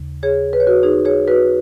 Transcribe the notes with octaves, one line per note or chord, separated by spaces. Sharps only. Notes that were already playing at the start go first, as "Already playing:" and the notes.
Already playing: D#2 C#3
G#4 C#5
B4
C#5
F#4 B4
D#4 G#4
G#4 C#5
F#4 B4